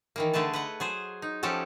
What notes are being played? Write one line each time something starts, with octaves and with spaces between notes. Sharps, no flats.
D#3 E3 A#3
D3 A3 G#4 B4 A5
B4 D#5 F#5
F#3 G#4 C5
D#4
F3 C#4 F#4 G4 A4